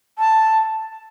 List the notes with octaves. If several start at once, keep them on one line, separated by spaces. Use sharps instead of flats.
A5